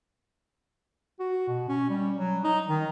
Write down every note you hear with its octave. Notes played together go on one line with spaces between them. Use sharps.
F#4
B2
C#4
G3
F#3
D#4
D#3